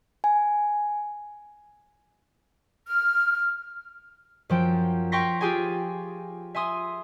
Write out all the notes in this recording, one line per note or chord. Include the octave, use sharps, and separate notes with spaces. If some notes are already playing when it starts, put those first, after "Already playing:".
G#5
F6
F#2 F3 G5
F5 G5 C6 C#6 A#6 B6
F4 G4 G#4 G5 G#5
E5 G#5 C6 D#6